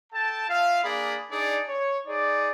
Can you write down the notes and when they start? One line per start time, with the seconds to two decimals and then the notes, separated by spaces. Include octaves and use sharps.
0.13 A4 G5 A5
0.49 F4 E5 F5
0.84 A#3 D4 G#4 D5 B5
1.31 D4 D#4 G#4 D5
1.68 C#5
2.06 D#4 G#4 D5